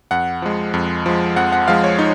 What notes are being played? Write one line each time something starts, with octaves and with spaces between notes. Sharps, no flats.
F2 F#5
F3 G#3
F2
F3 G#3
F2 F#5
F#5
F3 G#3 F5
C#5
D#4